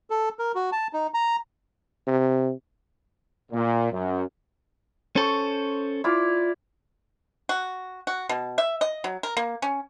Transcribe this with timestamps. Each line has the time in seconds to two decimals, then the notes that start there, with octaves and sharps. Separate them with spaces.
0.10 A4
0.39 A#4
0.55 F#4
0.72 A5
0.93 D#4
1.14 A#5
2.07 C3
3.52 A#2
3.92 F#2
5.16 C#4 A4 C5 C#6
6.04 E4 F4 D5
7.49 F#4
8.07 F#4
8.29 B2
8.58 E5
8.81 D#5
9.04 F#3
9.23 A#4
9.37 A#3
9.62 C#4